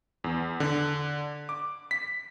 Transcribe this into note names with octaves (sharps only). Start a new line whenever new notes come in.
E2
D3
D6
B6